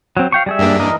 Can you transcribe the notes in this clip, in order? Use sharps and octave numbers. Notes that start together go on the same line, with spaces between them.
F#3 C4
F5 G5 C#6
G3 G#4 E5
G2 A#3 D4
E3 A#4 D#5